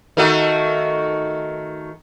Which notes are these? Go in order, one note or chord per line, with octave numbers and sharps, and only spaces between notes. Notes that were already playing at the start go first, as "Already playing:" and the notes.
D#3 A3 F#4